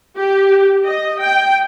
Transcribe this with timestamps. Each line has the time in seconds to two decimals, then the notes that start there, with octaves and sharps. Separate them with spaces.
0.18 G4
0.85 D#5
1.20 G5